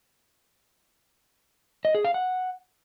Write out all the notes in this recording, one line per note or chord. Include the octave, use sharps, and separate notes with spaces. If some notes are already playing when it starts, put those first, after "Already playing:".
D#5
G#4
F5
F#5